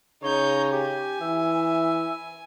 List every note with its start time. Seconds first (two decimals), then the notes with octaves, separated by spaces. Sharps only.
0.23 C#3 D#4 C#5 G6
0.72 G4 G#5
1.21 E3 E5